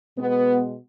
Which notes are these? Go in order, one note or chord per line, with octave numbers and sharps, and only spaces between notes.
B2 G#3 B3